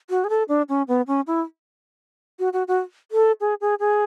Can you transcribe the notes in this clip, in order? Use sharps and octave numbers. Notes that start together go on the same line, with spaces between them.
F#4
G#4
A4
D4
C#4
B3
C#4
E4
F#4
F#4
F#4
A4
G#4
G#4
G#4